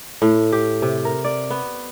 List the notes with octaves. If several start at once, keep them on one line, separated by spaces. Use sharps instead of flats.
A2
G4
C3
A#4
D5
B3